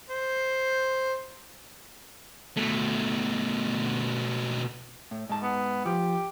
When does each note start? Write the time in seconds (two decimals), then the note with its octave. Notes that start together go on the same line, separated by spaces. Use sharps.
0.10 C5
2.57 B2 A3
5.11 A2
5.29 G#2 A5
5.43 B3
5.86 F3 G4